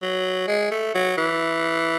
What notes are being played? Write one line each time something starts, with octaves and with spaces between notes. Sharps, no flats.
F#3
G#3
A3
F#3
E3